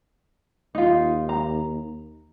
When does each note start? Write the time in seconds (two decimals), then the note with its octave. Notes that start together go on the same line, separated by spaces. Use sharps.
0.75 D#2 D#4 F4
1.29 A#5